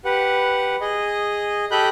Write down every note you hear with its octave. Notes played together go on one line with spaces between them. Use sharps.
G4 B4 F#5
G#4 D#5
G4 A4 D#5 B5 F#6 G6